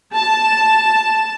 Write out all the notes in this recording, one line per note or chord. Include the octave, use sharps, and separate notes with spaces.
A5